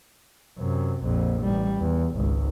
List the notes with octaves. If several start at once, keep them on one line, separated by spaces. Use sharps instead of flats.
F#2 C3
A#1 F2
A1 G3
E2
G#1 C#2